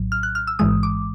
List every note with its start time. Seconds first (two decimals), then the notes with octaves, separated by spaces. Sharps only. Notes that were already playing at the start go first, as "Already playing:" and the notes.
Already playing: A#1 A2 F#3
0.12 F6
0.23 F#6
0.35 F6
0.47 E6
0.59 A1 G#2 E3 G#3 D#6
0.83 D6